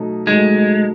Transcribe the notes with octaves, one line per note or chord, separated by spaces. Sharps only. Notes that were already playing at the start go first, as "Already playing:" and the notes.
Already playing: B2 F#3 A3 D#4
B2 F#3 G#3 A3 D#4